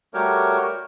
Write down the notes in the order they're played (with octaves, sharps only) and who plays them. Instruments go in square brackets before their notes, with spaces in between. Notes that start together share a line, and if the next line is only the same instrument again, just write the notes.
[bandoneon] G3 A3 F#4 G4 A#4 C#5